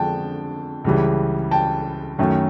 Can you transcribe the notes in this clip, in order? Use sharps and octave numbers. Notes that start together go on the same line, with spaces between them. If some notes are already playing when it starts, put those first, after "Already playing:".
Already playing: F2 D3 F3 G#3 G5 A5
C#2 C#3 E3 G3
G5 A5
F#2 D#3 F#3 A3